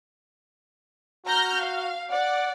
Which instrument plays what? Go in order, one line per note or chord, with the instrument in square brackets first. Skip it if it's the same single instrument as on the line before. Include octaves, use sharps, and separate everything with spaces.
[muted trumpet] F#4 [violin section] A#5 F6 G6
[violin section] F5
[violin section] D5 [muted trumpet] F#5